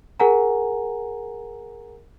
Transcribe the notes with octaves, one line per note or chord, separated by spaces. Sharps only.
G#4 A#4 F#5 G#5 A#5